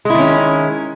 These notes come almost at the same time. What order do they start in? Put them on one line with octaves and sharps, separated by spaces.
G#3 E4 D#3 C#4